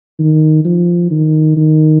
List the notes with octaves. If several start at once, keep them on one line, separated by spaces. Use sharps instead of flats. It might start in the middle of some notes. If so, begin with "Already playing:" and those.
D#3
F3
D#3
D#3